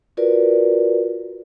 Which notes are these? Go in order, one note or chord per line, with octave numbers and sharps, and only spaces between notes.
F4 F#4 A#4 B4 D5